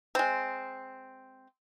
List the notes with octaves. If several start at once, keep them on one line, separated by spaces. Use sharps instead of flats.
G#3 C4